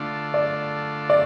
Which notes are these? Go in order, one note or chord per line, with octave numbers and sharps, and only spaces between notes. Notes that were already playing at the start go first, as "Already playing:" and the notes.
Already playing: D3 A3 D4 F4
D5
D5